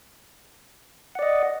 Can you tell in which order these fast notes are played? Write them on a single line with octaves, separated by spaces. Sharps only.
F#5 D5 D#5